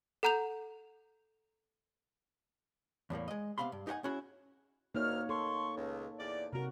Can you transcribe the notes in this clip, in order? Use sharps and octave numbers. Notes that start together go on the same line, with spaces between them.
A4 F#5 A#5 G6 F7
E2 A2 G3 A#3
G#3 D#5
C3 B3 F5 B5 C6
G2
D#4 G4 C#5 F#5 G#5
C#4 E4 F#4 G#4
D2 A#3 D#4 C#5 F6
A4 C6 C#6
C#2
E2 D5
C3 F#4 A#4